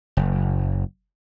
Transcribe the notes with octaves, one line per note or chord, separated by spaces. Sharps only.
F#1